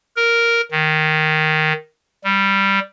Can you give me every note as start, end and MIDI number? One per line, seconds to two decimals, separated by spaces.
0.16 0.61 70
0.71 1.73 51
2.24 2.79 55